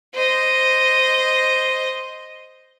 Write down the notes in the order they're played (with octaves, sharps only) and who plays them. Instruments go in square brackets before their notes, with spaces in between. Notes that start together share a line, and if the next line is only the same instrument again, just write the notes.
[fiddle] C5 D#5